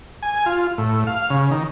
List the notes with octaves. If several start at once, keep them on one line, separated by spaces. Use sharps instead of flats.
G#5
F4
A2
F5
C#3
D#3